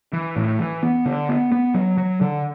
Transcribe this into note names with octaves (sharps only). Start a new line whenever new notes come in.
E3
A2
E3
B3
D3
B3
B3
F#3
F#3
D3